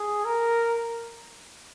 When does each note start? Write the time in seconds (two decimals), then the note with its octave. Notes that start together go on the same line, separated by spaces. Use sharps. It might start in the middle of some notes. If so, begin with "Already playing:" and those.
Already playing: G#4
0.25 A#4